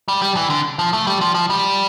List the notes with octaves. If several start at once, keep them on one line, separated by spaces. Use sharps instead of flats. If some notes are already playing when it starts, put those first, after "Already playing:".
G3
G3
E3
D3
F3
A3
G3
F3
F3
G3